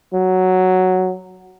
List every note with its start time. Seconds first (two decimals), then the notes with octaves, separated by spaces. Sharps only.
0.14 F#3